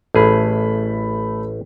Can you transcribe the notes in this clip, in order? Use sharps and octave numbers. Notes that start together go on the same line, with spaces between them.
A1 A3 G#4 B5